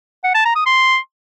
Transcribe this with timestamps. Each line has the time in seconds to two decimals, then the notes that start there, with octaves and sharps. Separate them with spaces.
0.24 F#5
0.35 A5
0.45 A#5
0.56 D#6
0.66 C6